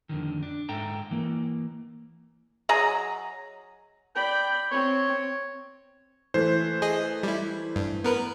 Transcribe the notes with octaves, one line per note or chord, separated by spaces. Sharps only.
F2 D3 D#3
D4
G#2 A4 E5 G5 A#5
E3 A#3
F#3 G#4 D#5 A#5
D5 G5 B5
C4 C#5
E3 A3 C5
G#4 D#5
G3 E4
G2
B3 A#4 B4